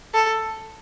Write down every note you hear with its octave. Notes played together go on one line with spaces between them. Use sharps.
A4